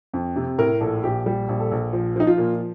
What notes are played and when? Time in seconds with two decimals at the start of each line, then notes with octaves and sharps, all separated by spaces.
0.14 F2
0.36 C3
0.58 A2 A#4
0.81 A#1 A4
1.03 A#1 G4
1.26 G3
1.49 A#1
1.59 A4
1.71 A#1
1.93 F3
2.16 F3 D#4
2.27 F4
2.38 A#2